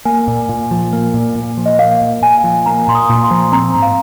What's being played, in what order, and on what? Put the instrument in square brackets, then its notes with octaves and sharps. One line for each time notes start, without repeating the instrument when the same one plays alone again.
[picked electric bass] A#3 [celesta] G#5
[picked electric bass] A#2
A#2
F3
A#3
A#2
A#2
F3
[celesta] D#5
[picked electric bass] A#3 [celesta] F5
[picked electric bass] A#2
[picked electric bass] A#2 [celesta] G#5
[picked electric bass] F3
[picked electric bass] A#3 [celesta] A#5
[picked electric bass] A#2 [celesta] C6
[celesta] D#6
[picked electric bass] A#2 [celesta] A#5
[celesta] C6
[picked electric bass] F3
[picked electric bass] C4 [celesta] A#5
[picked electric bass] G#2
[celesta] F5